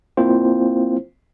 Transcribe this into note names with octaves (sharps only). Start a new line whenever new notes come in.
A#3 C4 E4 F4 C5